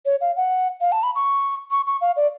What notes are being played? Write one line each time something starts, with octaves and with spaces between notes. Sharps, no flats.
C#5
F5
F#5
F5
A5
B5
C#6
C#6
C#6
F5
D5